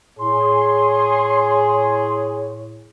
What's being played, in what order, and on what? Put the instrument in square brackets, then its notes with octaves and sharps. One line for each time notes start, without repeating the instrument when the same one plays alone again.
[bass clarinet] A2 [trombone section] G#4 [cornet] C#5 [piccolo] C6